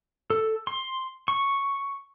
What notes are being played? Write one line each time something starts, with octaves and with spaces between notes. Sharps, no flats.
A4
C6
C#6